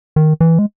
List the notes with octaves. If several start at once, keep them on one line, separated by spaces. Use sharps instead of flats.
D#3
E3
G#3